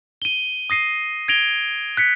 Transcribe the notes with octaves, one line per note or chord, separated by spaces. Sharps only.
D#7 G7
D#6 A#6 C7 D#7
G#6 A#6 D7 F7 G7
F#6 B6 C#7